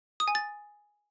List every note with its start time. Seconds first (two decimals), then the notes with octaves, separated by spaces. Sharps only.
0.20 D#6
0.28 G#5
0.35 A6